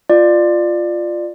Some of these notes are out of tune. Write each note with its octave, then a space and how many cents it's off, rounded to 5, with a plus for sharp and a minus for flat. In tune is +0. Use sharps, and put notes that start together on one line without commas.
F4 +0 D5 +20